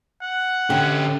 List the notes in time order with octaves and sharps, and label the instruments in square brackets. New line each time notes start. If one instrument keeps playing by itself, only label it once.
[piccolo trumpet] F#5
[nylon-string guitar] D3 [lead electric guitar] C#4 G4 [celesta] G5